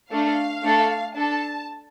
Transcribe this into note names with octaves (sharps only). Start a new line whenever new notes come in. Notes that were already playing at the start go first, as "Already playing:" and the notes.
A3 D4 A4 F5
A3 D4 A4
D4 A4 A5